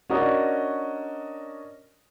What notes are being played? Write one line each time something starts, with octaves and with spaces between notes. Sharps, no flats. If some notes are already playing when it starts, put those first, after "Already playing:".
C#4 D4 F#4 A#4 D5 D#5